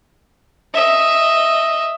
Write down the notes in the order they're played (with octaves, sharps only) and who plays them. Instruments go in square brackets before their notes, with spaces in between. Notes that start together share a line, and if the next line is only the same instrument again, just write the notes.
[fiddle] D#5 E5